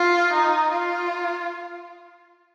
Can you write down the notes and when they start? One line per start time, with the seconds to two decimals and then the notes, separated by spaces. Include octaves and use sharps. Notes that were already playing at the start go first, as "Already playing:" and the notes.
Already playing: F4
0.33 D#4
0.73 F4